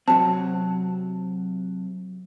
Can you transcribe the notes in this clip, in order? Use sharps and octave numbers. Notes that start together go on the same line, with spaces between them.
C3 F#3 C4 A5